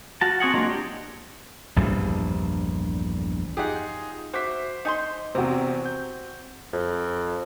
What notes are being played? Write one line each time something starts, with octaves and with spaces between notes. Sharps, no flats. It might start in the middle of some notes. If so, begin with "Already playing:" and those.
F4 F#4 A5
C4 F#4 G#4 F#5
F#3 G#3 A#3 D4 F4
D4 G4
A#1 E2 G2 G3
D#4 F4 G4 G#4 F#5
F#4 C5 E5 D6 B6
D#4 G#5 C6
E2 C3 C4 F#4 A#5
G6
F2